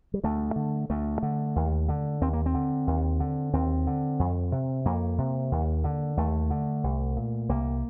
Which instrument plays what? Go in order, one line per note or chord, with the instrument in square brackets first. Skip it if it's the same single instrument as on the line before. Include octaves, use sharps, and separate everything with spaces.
[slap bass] G3
D2 A3
D3
D2 A3
D3
D#2
D3
D#2 C4
A#3
C4
D3
D#2
D3
D#2 C4
D3
F2
C3
F2 A#3
C3
D#2
D3
D#2 A3
D3
C2
A#2
C2 A#3